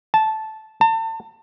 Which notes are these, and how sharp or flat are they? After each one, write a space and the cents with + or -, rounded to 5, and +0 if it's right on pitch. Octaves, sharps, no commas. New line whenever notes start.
A5 -10
A5 +35